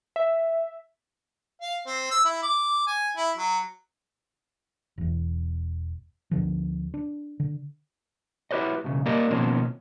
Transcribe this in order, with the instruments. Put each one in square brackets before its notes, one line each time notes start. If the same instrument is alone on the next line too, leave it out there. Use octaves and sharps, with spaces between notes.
[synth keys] E5
[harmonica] F5
C4
E6
E4
D6
G#5
E4
F#3
[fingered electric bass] E1 E2
D2 D3 F3
D4
D3
[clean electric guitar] E4 F#4 G4 B4 C#5 D#5
B1 F#2 C#3
A#3 G4 A#4 D5 D#5
B2 D#3 F3 A#3 C4 C#4